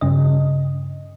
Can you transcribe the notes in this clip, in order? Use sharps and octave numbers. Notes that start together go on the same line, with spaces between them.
G2 C#3 D#5